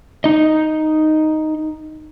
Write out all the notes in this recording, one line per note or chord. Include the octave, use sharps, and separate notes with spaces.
D#4 D#5